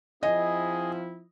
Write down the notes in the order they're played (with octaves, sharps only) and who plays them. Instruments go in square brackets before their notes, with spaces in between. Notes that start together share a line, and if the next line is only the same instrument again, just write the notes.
[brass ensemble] F3 C4 E4 [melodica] G#4 [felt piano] D#5